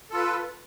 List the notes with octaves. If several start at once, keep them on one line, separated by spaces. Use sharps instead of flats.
F4 A4 B4